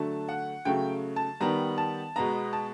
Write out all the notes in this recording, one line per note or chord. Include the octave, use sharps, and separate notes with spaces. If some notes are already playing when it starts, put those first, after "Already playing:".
Already playing: D3 F#3 A3 A5
F#5
C#3 F#3 A3 G5
A5
D#3 G3 B3 A#5
A5
B2 G#3 B3 A#5
A5